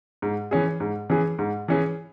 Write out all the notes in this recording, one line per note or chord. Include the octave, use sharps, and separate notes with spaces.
G#2
E3 C#4 G#4
G#2
E3 C#4 G#4
G#2
E3 C#4 G#4